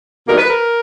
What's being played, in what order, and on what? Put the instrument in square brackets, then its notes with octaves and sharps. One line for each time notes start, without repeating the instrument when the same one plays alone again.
[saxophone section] E2 B2 G3 A#3 D#4 A#4
B4
A#4